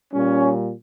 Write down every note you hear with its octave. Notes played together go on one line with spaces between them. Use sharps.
A#2 G3 C#4